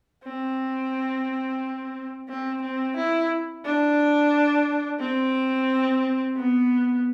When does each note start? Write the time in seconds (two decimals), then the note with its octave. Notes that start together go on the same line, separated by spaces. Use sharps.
0.24 C4
2.29 C4
2.62 C4
2.96 E4
3.65 D4
5.00 C4
6.36 B3